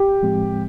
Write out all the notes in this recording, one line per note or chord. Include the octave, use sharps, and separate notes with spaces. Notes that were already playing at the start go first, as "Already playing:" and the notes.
Already playing: G4
A2 F3 G#3 C4